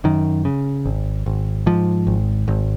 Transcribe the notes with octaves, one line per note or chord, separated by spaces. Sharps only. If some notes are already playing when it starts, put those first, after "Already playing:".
F#2 D#3
C#3
G#1
G#1
G#2 F3
G#1
G#1